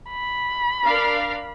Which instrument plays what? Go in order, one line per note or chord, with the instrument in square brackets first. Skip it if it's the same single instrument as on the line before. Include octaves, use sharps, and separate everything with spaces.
[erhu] B5
[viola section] D4 A#4 F5